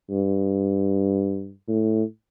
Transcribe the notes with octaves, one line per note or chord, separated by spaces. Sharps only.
G2
A2